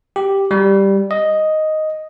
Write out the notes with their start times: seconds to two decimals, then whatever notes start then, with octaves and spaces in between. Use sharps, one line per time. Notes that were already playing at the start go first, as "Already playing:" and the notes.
0.16 G4
0.51 G3
1.11 D#5